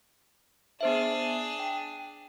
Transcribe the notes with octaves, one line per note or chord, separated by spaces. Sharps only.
B3 D4 G#4 C5 E5
G5